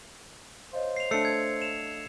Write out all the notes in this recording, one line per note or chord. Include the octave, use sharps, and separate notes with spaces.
C5 C#5 D#5 F5
C7 F7
A3 D4 E6 C7 C#7
G#6
E7 F7